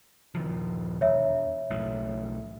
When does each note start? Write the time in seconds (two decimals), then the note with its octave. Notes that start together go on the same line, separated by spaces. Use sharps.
0.35 D#1 D#3 F3
1.01 E1 C#5 E5
1.70 B1 A2